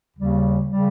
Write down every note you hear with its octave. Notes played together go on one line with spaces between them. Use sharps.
D#2 C#3 G3
C#3 G3